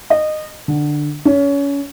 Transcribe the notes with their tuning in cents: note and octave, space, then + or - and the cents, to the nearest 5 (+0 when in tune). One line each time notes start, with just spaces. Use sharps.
D#5 -20
D3 +15
C#4 +25